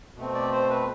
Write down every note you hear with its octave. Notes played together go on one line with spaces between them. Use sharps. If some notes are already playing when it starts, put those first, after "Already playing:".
B2 A3 C4
D5
C5
B4